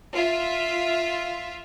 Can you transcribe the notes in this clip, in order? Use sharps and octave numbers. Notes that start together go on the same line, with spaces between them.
F4 E5